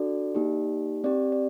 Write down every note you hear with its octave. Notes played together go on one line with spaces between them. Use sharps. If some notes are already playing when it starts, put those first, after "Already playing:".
Already playing: D4 F#4 A4 D5
A#3 D#4 G4
C4 G4 D5
D5